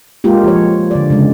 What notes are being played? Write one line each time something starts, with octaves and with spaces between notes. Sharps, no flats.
G#3 A#3 F4 G4
F3 C#5
D3 D5
C#3 G#3